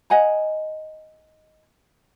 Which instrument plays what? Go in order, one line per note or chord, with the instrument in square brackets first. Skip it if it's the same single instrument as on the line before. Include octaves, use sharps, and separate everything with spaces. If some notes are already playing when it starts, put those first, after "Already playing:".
[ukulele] D#5 F#5 G#5 A#5